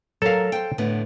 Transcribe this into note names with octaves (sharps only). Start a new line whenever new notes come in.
F#3 A4 A#4 F5
C5 G5
A2 D3 B3